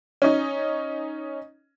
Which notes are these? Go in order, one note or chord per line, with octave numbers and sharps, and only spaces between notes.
C#4 D#4